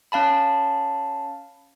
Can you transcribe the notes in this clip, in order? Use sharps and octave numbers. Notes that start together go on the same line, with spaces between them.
C#4 F5 A5 B5